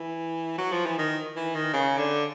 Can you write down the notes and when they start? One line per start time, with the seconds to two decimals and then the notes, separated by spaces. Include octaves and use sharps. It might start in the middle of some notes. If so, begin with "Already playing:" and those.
Already playing: E3
0.58 F#3
0.72 F3
0.86 E3
0.98 D#3
1.36 E3
1.55 D#3
1.73 C#3
1.98 D3